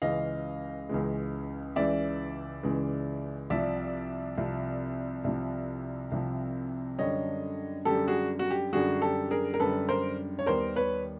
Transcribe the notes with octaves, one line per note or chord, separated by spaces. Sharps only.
C#2 C#3 E3 G#3 D#5 F5
C#2 C#3 E3 G#3
C#2 C#3 E3 G#3 D5 E5
C#2 C#3 E3 G#3
C2 C3 F3 D5 E5
C2 C3 F3
C2 C3 F3
C2 C3 F3
F#2 D3 G3 C#5 D#5
F#2 D3 G3 G4 A4
F#4 G#4
F#4
G4
F#2 D3 G3 F#4 G#4
G4 A4
G#4 A#4
A#4
F#2 D3 G3 A4 B4
A#4 C5
C#5
D#2 D#3 G3 B3 A#4 C5
B4 C#5